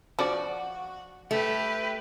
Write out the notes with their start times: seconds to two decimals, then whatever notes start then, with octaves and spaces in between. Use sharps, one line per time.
0.19 F3 D4 F#4 D5
1.31 A3 G4 B4